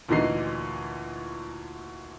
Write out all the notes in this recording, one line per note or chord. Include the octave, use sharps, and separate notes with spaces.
D2 A#2 E3 D#4 C7